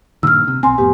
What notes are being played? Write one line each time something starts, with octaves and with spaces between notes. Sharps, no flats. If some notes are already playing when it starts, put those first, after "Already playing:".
G2 A#2 D#3 E6 F6
C3
B1 C4 G#5 C6
F2 A2 B3 G4